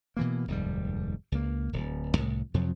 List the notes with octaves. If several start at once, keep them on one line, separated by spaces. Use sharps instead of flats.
B2 E3 A#3
F1 D#2 G#2 G3
C#2 A#3
D1
C2 A2
F2 C3 F3 F#3